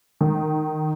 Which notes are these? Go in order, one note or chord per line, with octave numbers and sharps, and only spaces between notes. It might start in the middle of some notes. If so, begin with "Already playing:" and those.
D#3